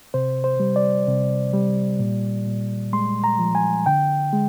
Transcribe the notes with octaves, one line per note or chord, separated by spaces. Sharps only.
C3 C5
C5
G3
D5
C3
G3
A#2
A#2
G#3 C6
A#5
F3
G#5
D3 G5
G#3